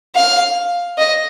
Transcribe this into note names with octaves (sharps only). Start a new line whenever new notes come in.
F5
D#5